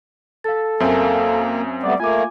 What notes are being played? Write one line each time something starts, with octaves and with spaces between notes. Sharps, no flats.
A4 F5 A6
F#2 A#3 C4 E5 F5 G#5
G3 A3 B3 D5
A3 A#3 F4 G#5 D6